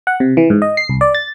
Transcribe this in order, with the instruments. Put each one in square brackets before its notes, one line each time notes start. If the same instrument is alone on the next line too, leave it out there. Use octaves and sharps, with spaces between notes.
[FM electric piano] F#5
C3
E3
G#2
D#5
C7
C2
D5
A6